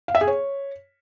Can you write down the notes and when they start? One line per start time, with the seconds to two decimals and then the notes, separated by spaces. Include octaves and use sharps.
0.08 F5
0.15 E5
0.21 G#4
0.27 C#5